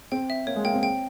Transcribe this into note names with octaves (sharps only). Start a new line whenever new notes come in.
C4 G5
E5
A#3 C#5
G#3
A#3 G5
C4
G5